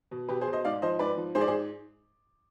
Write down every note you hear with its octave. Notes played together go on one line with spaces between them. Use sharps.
B2
B2 G4 B4
G#4 C5
B2
C5 D#5
G#2 D5 F5
F3 C5 D#5
G#2 B4 D5
F3
G#2 G#4 C5
D5
G#4 C5